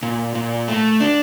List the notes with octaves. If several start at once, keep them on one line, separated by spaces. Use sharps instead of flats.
A#2
A#2
A3
D4